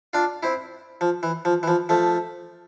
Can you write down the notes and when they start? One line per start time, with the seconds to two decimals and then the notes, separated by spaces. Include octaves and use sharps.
0.13 D4 F4
0.43 C4 E4
1.01 F3
1.23 E3
1.45 F3
1.63 E3
1.68 F3
1.89 F3 A3